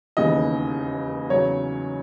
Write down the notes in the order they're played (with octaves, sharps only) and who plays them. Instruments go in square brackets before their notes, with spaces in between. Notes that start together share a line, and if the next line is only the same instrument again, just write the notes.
[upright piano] E1 D#2 C#3 E3 D#5
E2 C#3 F#3 C#5